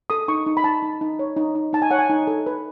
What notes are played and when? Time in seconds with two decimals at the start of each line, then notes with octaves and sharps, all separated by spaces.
0.10 A4 D#6
0.28 D#4 C#6
0.46 D#4
0.57 B5
0.64 D#4 A5
0.82 D#4
1.01 D#4
1.19 C#5
1.37 D#4
1.55 D#4
1.73 D#4 A5
1.82 G#5
1.91 C#5 F#5
1.99 G#5
2.10 D#4
2.27 A4
2.46 B4